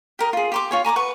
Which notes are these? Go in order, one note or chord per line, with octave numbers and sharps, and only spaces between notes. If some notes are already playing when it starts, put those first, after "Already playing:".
G4 A#4 D#5
F4 G#4
G4 C6 D6
F4 C#5 G#5
G#5 A#5 C#6 D6
B4 F#5 C#6